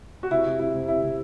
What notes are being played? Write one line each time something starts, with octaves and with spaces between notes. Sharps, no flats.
F#4
C3 E4
C3
C3 E4
C3
C3 E4
C3